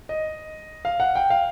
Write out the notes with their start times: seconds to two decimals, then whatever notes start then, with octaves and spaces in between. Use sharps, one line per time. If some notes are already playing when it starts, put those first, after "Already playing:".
0.09 D#5
0.85 F5
1.00 F#5
1.15 G5
1.30 F5